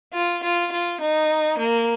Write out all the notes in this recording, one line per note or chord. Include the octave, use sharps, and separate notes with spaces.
F4
F4
F4
D#4
A#3